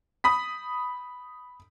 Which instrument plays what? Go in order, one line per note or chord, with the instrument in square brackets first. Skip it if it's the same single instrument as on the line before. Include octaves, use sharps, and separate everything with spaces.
[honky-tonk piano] B5 D#6 B6